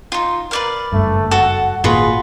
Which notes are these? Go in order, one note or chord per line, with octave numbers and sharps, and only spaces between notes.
D#4 F4
A#4 B4 D5 F5
F#1 G2 A3
F#4 A4 F#5
G#1 A#2 A#3 F4 F#4 G#4 B4